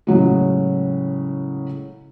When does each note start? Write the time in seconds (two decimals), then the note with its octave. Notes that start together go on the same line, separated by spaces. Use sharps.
0.07 A2 C#3 F#3 G#3